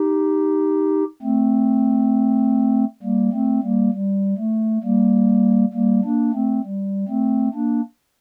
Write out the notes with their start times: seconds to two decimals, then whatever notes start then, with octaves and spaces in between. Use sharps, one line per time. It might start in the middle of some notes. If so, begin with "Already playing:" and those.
Already playing: D#4 G4
1.22 A3 C4
3.02 G3 A#3
3.32 A3 C4
3.63 G3 A#3
3.93 G3
4.38 A3
4.83 G3 A#3
5.73 G3 A#3
6.04 A#3 D4
6.33 A3 C4
6.64 G3
7.08 A3 C4
7.54 A#3 D4